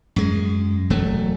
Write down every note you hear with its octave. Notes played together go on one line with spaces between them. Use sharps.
F#2 G#3
E1 F#3 A3